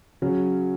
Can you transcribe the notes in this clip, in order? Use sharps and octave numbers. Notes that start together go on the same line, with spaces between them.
C#3 F#3 C#4